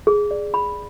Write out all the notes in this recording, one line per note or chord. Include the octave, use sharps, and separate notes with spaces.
G#4
D5
B5